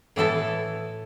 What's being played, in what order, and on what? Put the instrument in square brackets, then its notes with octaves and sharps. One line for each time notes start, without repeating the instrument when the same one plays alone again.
[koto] A2 E3 B3 E4 A4